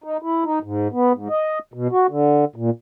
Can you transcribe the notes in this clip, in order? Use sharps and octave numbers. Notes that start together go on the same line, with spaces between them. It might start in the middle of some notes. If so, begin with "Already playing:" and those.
D#4
E4
D#4
G#2
B3
G#2
D#5
B2
F#4
D3
A#2